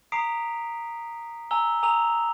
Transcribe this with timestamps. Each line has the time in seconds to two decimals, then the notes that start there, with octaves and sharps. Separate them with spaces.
0.12 A#5 D#6 B6 C7 D7 F7
1.51 G#5 A#5 E6 G7
1.83 G#5 A#5 D#6 E6 F7